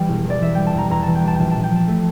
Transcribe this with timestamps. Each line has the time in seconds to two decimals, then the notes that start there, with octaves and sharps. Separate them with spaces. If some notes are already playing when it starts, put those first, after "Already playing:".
Already playing: E3 G3 G5
0.09 E1
0.26 E2 D5
0.41 E3 E5
0.55 G3 G5
0.67 A5
0.74 E1 A#5
0.90 E2 A#5
1.03 E3 A5
1.15 G5
1.23 G3 A5
1.35 A#1 G5 A5
1.51 A#2 A5
1.63 G5
1.71 F3 A5
1.88 A3